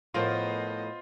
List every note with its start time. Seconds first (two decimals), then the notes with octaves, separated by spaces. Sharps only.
0.14 A2 F3 B3 F4 A#4 C5 D#5